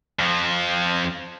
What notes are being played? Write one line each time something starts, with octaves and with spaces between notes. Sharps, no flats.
F2 F3